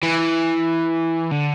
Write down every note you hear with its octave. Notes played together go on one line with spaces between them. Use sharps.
E3
D3